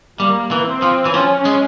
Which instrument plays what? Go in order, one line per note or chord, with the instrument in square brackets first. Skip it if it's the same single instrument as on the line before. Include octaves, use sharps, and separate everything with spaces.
[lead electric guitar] G3 [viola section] A#3
[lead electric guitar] E3
[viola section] C4
[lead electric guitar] F3
E3
[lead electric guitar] F3 [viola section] C#4
[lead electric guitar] G#3